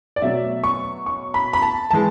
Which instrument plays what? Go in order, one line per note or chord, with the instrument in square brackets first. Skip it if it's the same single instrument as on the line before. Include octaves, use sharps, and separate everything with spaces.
[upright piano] D5
B2 F#3 A3 E5
C#6
C#6
B5
B5
A5
E3 G#3 A5